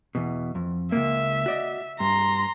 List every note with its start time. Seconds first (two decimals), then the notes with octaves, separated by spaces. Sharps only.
0.15 E2 B2
0.55 F2
0.92 C#2 G#2 A#3 E5
1.46 F#4 D5 D#5
2.00 G2 A#5 C6